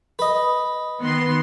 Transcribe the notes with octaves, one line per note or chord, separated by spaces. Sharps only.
B4 D#5
D#3 B3 C6